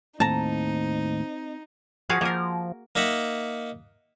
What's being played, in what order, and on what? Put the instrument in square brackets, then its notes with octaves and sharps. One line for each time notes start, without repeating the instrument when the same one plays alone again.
[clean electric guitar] D#2 A2 [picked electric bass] C4 [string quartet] D#4 [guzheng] A5 A#5
[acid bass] F3 [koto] F#4 G#4 F5
[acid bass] F3 [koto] A#3 A#4
[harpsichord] A#3 D#4 D#5 E5 F#5